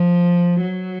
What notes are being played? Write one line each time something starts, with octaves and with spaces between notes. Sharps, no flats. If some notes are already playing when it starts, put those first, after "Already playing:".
Already playing: F3
F#3